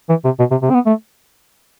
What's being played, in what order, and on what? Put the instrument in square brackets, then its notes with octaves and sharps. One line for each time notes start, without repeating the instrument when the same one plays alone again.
[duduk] E3
C3
B2
C3
C3
C4
B3
A3